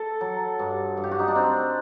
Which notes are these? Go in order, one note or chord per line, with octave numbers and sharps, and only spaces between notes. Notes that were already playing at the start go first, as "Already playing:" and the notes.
Already playing: A4
F#3
G2
G2
G4
F#4
D#4
D4
C4